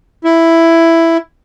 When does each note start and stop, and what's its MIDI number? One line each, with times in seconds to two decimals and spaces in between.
0.25 1.17 64